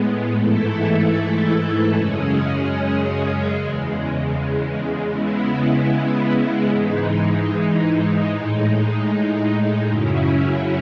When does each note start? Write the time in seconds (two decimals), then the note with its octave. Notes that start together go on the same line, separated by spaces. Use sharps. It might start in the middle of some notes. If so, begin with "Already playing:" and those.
Already playing: A2 G#3 B3
0.34 G#2 E3 A3 E4 A4
1.93 F#2 C#3 G#3 C#4 G#4
3.51 E2 C#3 G#3
5.10 C#3 G#3 B3 E4
6.69 G#2 E3 G#3 D#4
8.27 A2 G#3 D#4
9.86 F#2 C#3 F#3 C#4 E4